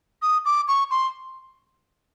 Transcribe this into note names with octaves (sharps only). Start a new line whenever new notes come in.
D#6
D6
C#6
C6